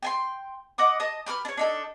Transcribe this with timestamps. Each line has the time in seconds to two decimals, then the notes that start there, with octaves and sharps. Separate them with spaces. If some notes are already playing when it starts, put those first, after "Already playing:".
0.03 G5 G#5 C6
0.78 D#5 F#5 D6 D#6
1.00 D#5 A5 D#6
1.26 G4 B4 C#6 F6
1.45 D4 C#5
1.57 D4 D#4 A4